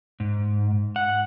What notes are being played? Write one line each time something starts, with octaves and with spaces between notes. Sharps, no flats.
G#2
F#5